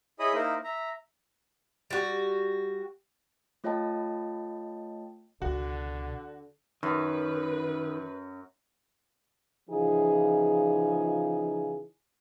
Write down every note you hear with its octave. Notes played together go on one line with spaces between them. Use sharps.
E4 G#4 C#5 D#5 B5 D#6
A#3 D#4 E4 A#4 C5
E5 A#5
G3 F#4
A3 F4 C#5 D#5 G5 A5
C#2 B2 D3 F#4
F#2 D#3 B4
C#3 E3 F3 D#4 F4 G#4